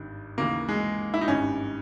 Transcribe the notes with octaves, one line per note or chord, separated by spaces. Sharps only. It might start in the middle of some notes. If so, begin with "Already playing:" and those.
Already playing: G#1 G2 D#3
D#2 C#3 E3 A#3
G#3
E4
D#4
G#1 G2 D#3 C#4